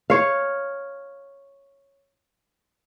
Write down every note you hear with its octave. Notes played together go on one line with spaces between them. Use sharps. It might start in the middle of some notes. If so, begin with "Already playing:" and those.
C#5 F5